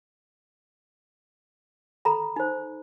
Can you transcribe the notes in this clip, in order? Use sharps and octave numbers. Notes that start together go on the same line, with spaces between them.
A4 A#5 B5
D#4 C5